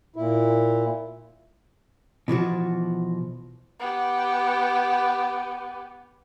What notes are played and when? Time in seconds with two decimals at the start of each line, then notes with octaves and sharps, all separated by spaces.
0.16 A#2 E4
2.28 B2 E3 F3 F#4
3.79 B3 G4